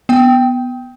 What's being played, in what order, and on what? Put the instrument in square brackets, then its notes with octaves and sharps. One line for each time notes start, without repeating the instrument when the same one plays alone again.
[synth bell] B3 G5